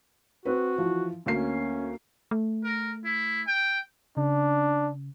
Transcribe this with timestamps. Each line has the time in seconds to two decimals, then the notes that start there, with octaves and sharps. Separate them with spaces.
0.45 C4 F#4 B4
0.78 E3 F3
1.26 D2 A#3 C#4 C7
2.31 A3
2.64 A#4
3.05 E4
3.47 G5
4.17 C#3 D4